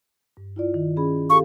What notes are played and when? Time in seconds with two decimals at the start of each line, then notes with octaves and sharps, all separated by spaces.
0.37 G2
0.56 E4 F4 D5
0.74 D#3
0.97 C#4 G#4 B5
1.30 G4 A4 F5 C#6